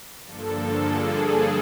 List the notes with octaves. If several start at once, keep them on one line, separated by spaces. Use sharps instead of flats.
G2 D3 F3 A#3 D4 A4
G#4